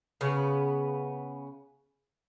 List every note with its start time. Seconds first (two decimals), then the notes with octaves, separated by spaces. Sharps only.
0.21 C#3 B3